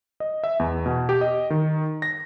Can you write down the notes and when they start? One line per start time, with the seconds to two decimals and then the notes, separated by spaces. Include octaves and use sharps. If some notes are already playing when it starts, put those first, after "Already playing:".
0.20 D#5
0.44 E5
0.60 E2
0.86 B2
1.09 G4
1.21 D#5
1.50 D#3
2.02 A#6